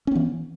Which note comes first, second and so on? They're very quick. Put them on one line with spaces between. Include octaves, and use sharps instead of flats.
C#4 B3 E3